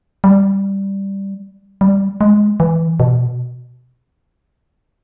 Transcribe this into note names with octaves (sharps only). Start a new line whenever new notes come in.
G3
G3
G#3
E3
B2